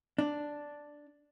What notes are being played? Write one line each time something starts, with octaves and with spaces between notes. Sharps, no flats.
D4